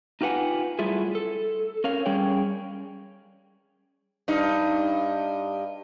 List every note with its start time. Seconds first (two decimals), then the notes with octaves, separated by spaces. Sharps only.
0.21 D#4 F4 G4 B4 F#5 G#5
0.79 F#3 G3 A3 E4 F4 G#4
1.15 A4
1.84 C#4 A#4 C#5 F5
2.06 G3 C#4 G#4 C#5 G5
4.28 G2 D#4